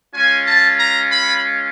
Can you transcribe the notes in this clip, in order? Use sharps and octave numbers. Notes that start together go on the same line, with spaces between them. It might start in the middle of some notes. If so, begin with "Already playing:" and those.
G#3 C#4 F4 G#5
A5
A#5
B5